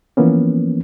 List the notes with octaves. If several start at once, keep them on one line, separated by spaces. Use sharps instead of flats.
E3 F3 A#3 B3 C#4